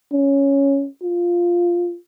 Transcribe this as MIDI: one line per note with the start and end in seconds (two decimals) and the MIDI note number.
0.12 0.87 61
1.02 1.96 65